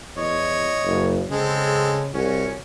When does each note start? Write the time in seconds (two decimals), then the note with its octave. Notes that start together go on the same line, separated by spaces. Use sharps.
0.17 E2 C#5 D#5
0.84 F#1
1.30 C#3 G#3 C4 A4
2.14 C2 C#4 F#4